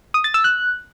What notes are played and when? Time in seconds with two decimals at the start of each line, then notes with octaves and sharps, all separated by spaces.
0.14 D#6
0.24 A6
0.34 E6
0.44 F#6